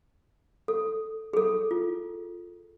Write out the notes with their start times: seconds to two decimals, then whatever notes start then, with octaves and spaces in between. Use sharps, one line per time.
0.68 A4
1.33 G#4 A4
1.71 F4